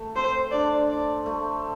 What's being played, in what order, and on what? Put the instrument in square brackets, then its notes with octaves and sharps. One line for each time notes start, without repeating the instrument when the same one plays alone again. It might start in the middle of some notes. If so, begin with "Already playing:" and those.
Already playing: [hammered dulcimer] A3
[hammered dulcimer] C4 [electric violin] C5
[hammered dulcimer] D4 [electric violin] D5
[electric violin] D5
[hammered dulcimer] A3